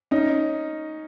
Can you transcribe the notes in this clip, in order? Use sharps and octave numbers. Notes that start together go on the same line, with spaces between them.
C#4 D#4